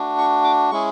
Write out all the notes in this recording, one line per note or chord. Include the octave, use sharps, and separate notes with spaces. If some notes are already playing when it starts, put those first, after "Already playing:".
Already playing: A3 D4 F#4
C#6
D6
G#3 C#4 E4 G#4 C#6